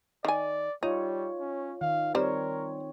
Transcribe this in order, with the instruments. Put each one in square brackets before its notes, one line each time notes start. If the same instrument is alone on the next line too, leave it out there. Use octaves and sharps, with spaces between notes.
[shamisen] D#3 G#5 [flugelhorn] D5
[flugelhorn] G3 [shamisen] D#4 [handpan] F4 C#5
[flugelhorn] C#4
[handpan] D#3 [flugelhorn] F5
[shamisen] G3 C5 [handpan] C4 C#5 [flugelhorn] A#4